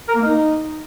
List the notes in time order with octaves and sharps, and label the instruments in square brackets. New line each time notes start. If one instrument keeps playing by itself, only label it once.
[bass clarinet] A#4
A#3
D#4